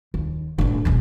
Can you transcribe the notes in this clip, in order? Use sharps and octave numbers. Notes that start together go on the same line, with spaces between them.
D#2
A1 D3
E1 A#1